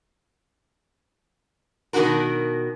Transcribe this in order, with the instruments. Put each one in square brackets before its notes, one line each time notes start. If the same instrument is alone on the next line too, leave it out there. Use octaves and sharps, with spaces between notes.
[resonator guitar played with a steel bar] B2 D#3 G3 D4 F#4 A#4